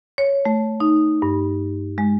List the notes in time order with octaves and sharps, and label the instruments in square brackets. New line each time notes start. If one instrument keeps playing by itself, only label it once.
[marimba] C#5
A3
D#4
G2
G#3